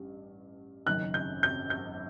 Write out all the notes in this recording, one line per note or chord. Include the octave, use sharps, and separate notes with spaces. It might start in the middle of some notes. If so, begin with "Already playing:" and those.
Already playing: A1 G2
F#1 F#2 D#3 F#6
G6
G6
G6